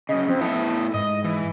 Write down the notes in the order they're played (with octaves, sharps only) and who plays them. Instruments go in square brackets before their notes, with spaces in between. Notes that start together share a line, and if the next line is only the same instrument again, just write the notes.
[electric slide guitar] F#2 C#3 [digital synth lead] D#5
[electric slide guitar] F2 [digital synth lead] C4
[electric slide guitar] A2 B3 A4 [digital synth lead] E4
[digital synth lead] G#2 [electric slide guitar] D#5
[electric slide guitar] E3